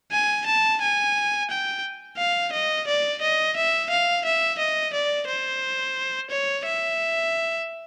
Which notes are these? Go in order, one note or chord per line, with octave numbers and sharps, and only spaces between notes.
G#5
A5
G#5
G5
F5
D#5
D5
D#5
E5
F5
E5
D#5
D5
C5
C#5
E5